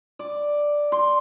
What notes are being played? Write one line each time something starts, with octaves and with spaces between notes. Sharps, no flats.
D5
C6